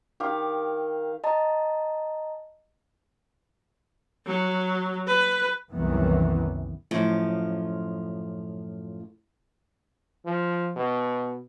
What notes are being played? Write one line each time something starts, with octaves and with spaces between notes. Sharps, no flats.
D#3 G4 F5
D#5 A5 A#5
F#3
B4
C2 F#2 D#3 E3 B3
F#2 A2 F3 F4
F3
B2